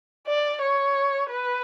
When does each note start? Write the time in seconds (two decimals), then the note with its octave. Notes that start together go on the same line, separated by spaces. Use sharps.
0.27 D5
0.61 C#5
1.30 B4